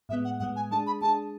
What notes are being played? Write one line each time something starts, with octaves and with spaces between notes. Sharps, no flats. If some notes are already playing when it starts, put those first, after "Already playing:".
A2 G#3 B3 E5
F#5
A2 G#3 B3 F#5
G#5
G#3 D4 G#4 A5
B5
G#3 D4 G#4 A5